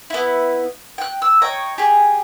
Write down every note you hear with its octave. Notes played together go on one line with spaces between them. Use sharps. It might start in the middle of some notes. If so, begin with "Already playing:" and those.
B3 E4
G5 F#6
E6
C#5 D#5 G5 A#5
G4 G#4